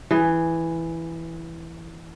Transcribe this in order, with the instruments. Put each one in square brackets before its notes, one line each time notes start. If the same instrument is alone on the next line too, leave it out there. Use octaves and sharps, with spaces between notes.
[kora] E3 G#4